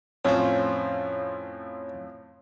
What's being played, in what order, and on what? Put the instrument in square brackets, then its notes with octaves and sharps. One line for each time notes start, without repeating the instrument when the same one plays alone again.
[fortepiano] F2 A2 F4 [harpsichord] C#4 C5 [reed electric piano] C#5 F5